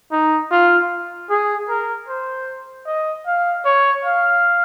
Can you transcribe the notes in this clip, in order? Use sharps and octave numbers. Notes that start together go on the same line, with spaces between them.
D#4
F4
G#4
A#4
C5
D#5
F5
C#5
F5